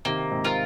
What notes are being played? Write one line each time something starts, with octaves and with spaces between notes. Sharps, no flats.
C3 D#3 A#3
G#2 C3
F4 A#4